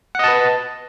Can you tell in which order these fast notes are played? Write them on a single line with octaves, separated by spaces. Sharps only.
F#5 D#5 A5 B4